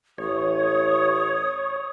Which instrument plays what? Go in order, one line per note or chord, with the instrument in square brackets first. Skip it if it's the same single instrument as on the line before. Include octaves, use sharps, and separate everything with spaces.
[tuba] A1 [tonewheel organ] C#5 [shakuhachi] D#6